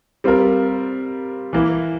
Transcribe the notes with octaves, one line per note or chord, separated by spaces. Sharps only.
G3 C4 F4 A#4
E3 A#3 E4